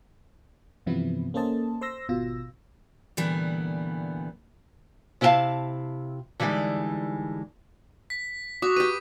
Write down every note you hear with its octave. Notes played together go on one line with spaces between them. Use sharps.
G2 C3 E3 F3 B3 E4
A#3 C#4 A4 C5 D#5 A5
C5 C6 E6 A#6
G#1 B2 F4 E6 A#6
A#2 D3 E3 G3 B3
C3 E4 G4 D#5 F5 A5
D3 E3 G3 G#3 D#4
B6
F#4 D6 D#6
G4 B4 D#7